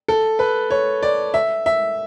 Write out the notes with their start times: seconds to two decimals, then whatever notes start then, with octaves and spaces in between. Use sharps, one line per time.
0.08 A4
0.39 B4
0.70 C#5
1.03 D5
1.34 E5
1.66 E5